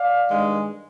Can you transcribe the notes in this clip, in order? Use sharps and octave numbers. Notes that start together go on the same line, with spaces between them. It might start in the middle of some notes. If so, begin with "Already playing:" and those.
Already playing: D5 F5
G2 D#3 G#3